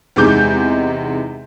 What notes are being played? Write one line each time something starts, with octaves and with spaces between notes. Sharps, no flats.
E2 C3 G#3 D#4 D6 G6